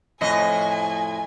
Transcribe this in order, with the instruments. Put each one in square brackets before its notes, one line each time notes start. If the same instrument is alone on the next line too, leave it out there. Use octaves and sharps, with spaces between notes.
[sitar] F2 A2 D#5 [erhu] G#5